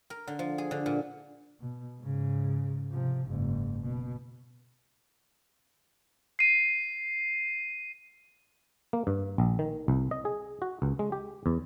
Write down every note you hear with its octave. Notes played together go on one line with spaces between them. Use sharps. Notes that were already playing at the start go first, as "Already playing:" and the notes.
A#4
D3
F3
G#4
D3
A#2
B2
G#2 C#3
C3 F3
F#1 G#2
B2
C7 D#7
A#3
G2
A#1
D#3
C2
D#5
G#4
F#4
C#2
G#3
G4
E2